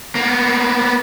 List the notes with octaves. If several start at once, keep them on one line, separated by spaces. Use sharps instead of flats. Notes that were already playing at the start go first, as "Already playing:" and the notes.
A#3 B3